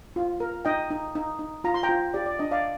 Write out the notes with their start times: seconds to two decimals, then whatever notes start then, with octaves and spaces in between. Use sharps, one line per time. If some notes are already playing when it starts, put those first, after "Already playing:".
0.16 F4
0.40 A#4
0.65 D#4 D#5 G5
0.90 D#4
1.15 D#4
1.39 D#4
1.64 F4 A#5
1.74 C6
1.83 G5 A#5
1.89 F4
2.14 G4 D5
2.26 D5
2.39 D4 D#5
2.51 D5 F5